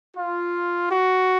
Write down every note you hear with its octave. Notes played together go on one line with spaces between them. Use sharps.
F4
F#4